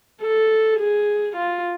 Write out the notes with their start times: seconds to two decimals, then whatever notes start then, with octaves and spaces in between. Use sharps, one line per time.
0.21 A4
0.79 G#4
1.36 F4